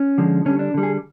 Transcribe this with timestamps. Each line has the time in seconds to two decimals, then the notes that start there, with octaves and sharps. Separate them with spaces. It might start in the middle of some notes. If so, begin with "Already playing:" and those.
Already playing: C#4
0.18 D3 F3 G#3
0.45 D3 G3 C#4
0.59 D4
0.74 D3 G3
0.83 G#4